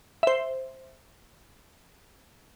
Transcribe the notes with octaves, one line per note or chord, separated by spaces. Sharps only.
C5 E5